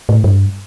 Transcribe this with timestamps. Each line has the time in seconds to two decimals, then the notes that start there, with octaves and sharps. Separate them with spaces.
0.09 A2
0.24 G2